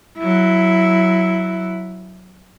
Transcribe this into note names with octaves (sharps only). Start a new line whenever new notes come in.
F#3 E4